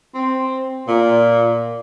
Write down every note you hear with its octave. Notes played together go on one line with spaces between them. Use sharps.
C4
A#2